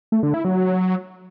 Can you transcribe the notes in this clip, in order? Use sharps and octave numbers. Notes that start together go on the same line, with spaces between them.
A3
D3
E4
F#3